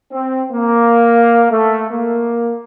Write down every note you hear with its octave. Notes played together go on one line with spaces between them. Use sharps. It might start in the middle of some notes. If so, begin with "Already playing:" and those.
C4
A#3
A3
A#3